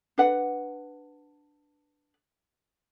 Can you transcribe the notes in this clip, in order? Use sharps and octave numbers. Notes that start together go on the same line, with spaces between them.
D4 B4 F#5